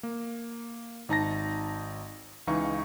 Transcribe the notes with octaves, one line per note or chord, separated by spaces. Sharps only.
A#3
G#1 D#4 A5 A#6
C#2 E3 D#4 F5 C#6